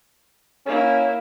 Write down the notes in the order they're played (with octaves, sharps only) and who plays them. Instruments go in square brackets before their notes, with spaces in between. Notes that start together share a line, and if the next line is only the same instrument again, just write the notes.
[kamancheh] A#3 E4 [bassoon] C#4